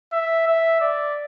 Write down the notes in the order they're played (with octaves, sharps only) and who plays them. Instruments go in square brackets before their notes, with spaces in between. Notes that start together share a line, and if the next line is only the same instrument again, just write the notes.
[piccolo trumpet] E5
E5
D5